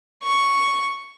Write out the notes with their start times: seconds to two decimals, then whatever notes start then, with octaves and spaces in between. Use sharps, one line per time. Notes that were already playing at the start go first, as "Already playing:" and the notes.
0.23 C#6